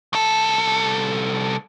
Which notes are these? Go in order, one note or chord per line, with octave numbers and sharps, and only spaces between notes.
C2 A4